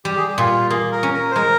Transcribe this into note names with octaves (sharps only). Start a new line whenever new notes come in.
G3 G4
G#4
G4
A#2 F4
A#3 G#4
A#4
C#4
A#4
C5
G#3 A#4